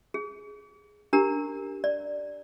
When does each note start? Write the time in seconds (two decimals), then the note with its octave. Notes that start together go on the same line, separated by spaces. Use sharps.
0.14 G#4
1.13 D4 G4 A#4 A#5
1.84 D5